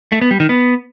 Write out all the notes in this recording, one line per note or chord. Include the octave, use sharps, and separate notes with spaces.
A3
B3
G3
D#3
B3